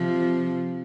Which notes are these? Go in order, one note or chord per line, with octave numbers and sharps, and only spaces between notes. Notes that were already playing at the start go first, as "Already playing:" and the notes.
Already playing: C3 F3